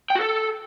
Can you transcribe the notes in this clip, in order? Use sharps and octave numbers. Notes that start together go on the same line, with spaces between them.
G5
F#4
A4